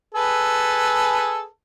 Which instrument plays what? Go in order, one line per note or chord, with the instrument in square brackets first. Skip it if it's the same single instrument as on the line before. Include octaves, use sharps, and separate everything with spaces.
[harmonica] G#4 A4 B4